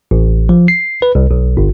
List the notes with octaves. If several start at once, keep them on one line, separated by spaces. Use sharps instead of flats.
A1
F3
C7
B4
C2
B1
G1